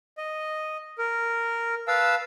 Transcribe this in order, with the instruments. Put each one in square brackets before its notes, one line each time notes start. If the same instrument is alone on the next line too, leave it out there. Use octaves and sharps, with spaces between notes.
[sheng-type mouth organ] D#5
A#4
B4 F5 A5 E6